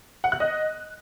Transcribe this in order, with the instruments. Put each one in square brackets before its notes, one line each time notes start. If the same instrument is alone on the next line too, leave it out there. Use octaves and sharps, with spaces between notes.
[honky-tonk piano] F#5
F#6
D#5